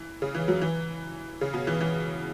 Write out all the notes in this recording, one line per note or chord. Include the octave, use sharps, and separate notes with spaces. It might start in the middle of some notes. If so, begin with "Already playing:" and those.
Already playing: E3
C#3
E3
F#3
E3
C#3
B2
E3
E3